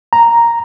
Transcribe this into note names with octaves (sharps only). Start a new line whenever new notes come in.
A#5